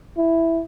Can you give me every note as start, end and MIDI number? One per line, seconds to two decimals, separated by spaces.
0.17 0.62 64